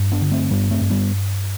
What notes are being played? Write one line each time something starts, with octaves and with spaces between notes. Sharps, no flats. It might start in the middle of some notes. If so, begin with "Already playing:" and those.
Already playing: G2
B3 D4
D3
A3 C4
G2 G3 B3
A3 C4
G2
G3 B3